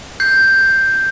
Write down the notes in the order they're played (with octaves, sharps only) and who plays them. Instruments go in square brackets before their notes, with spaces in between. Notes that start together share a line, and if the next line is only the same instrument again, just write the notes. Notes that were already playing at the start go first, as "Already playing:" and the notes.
[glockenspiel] G6 C7